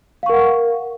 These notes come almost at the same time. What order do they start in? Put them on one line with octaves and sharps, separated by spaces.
F5 C#6 A#4 F#5